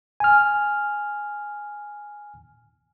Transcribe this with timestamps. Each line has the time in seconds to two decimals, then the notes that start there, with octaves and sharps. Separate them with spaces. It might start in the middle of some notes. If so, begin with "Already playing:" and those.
0.20 G#5 F6